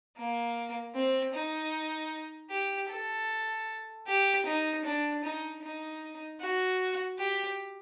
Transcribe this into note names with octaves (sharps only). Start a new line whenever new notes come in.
A#3
C4
D#4
G4
A4
G4
D#4
D4
D#4
D#4
F#4
G4